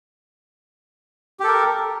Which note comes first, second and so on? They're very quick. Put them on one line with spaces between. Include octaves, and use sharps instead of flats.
G4 A4 A#4